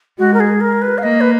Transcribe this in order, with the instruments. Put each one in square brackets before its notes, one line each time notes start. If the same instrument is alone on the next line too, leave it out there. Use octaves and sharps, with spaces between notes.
[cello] G#3 [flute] F#4
[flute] A#4
G#4
A#4
B4
F5
[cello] A#3 [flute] D#5
[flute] B4